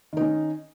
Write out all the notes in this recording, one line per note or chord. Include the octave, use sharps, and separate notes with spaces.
D#3 C#4 D#4